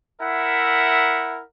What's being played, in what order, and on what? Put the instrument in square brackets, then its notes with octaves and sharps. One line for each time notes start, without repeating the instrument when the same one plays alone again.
[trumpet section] E4 A#4 E5 F#5